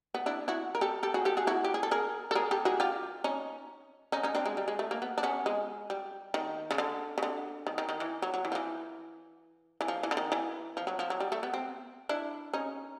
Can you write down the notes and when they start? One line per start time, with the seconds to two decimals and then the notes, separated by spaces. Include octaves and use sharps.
0.14 B3
0.26 D4 E4
0.48 E4 F#4
0.75 A#4
0.81 G4 A4
1.03 G4 A4
1.14 F#4 G#4
1.25 G4 A4
1.37 F#4 G#4
1.47 E4 F#4
1.64 G4
1.74 G#4
1.83 A4
1.91 G#4 A#4
2.31 A4
2.35 G#4 A#4
2.51 G4 A4
2.65 F#4 G#4
2.80 F4 G4
3.24 C#4 D#4
4.12 C#4 D#4
4.23 C#4 D#4
4.35 C4 D4
4.46 G#3
4.57 G3
4.68 G#3
4.79 A3
4.91 A#3
5.02 B3
5.18 D4
5.23 B3 C#4
5.46 G#3
5.90 G3
6.34 D#3
6.71 C#3
6.78 D3
7.18 C#3
7.23 D3
7.67 D#3
7.78 D#3
7.89 D#3
8.00 E3
8.22 F#3
8.34 F#3
8.45 E3
8.52 F3
8.55 E3
9.81 E3
9.88 F3
10.03 E3
10.11 D3
10.17 D#3
10.32 E3
10.77 F3
10.87 F#3
10.99 F3
11.10 F#3
11.20 G3
11.32 A3
11.43 B3
11.54 C4
12.09 D4 E4
12.53 C#4 D#4